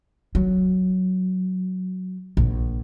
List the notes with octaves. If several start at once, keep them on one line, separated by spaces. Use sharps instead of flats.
F#3
A#1